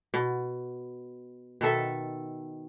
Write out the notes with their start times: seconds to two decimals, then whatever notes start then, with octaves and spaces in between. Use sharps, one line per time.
0.14 B2
1.61 B2 D#3 A4 E5